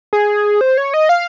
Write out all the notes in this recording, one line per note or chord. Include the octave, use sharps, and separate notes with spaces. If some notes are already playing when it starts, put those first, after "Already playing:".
G#4
C5
C#5
D#5
F5